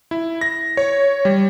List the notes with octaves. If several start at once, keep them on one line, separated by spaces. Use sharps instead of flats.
E4
A#6
C#5
G3